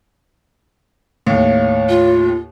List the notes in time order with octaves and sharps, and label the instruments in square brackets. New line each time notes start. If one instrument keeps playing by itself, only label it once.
[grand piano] D#2 A2 [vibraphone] C#5 F5
[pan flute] F4